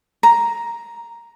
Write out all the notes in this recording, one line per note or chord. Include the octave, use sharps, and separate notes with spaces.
A#5